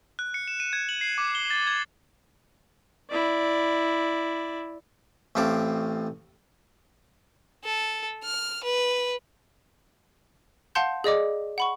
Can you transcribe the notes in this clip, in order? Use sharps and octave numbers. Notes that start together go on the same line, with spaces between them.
F#6
C#7
E7
D#7
G#6
F#7
C7
D6
G7
A6
G#6
E4 D5
A1 A2 C4 F5 A5 D6
A4
F6
B4
F5 F#5 A5 C6 G6
G#4 D5 D#5 D6
F#5 B5 C#6